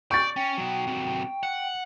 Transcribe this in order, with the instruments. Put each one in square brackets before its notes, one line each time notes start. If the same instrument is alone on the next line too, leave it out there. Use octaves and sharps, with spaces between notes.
[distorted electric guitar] D5 [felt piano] C#6 A6 [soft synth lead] G6
[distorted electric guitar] C#4 [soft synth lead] G5
[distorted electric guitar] B2 F#3
C3 F#3
F#5